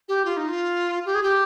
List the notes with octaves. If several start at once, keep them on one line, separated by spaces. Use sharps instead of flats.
G4
F4
D#4
F4
G4
G#4
G4